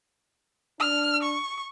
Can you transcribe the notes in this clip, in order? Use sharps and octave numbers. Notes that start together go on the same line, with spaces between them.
D4 F6
C#6